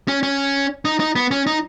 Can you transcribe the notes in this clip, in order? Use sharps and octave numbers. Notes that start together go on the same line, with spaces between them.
C#4
C#4
D#4
D#4
B3
C#4
D#4